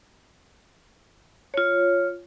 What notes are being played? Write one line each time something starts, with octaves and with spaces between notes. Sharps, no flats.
F4 C#5